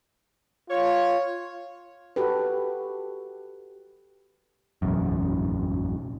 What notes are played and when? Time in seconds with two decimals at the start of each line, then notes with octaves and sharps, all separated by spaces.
0.70 F4 C#5
2.16 F#4 G4 A4 B4
4.82 E1 A1 F#2